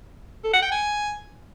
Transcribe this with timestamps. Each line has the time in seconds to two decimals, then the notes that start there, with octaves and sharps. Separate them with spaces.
0.44 A4
0.53 F#5
0.62 G5
0.72 G#5